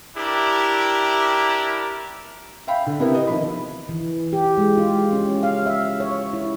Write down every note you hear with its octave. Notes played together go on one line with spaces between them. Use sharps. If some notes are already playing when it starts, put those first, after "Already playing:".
D4 E4 G4 A#4
E5 F5 G5 B5
D3
C3 B3 E4 A#4
D#5
D#3 F3 B5
E3
G4
G#3
F4
C#4
F5
E5
C#5
E4